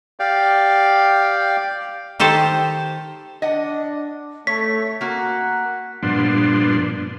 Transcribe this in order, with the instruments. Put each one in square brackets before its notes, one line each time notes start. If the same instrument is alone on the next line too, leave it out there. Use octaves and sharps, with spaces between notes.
[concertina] G4 D5 F5 G5
[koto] D#3 G4 A4 C5
[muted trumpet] D4 [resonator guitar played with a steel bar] D#5 F#5
[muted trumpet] A3 [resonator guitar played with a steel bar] C#5 [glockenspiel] B6
[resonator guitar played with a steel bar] A#3 F#4 A#4 [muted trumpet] F#5
[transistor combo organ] G2 A#2 F3 B3 D4 C6